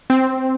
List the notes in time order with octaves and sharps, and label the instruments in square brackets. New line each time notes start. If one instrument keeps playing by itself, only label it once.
[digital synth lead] C4